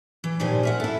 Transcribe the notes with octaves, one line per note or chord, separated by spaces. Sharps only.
E3
A#2 D#3 F3 G4 C5 G#5
A#4 E5 F#5
E4 A4